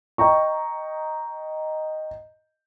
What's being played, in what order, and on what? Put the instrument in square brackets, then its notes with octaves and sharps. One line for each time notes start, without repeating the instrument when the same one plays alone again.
[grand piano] D#5 G5 A#5 C#6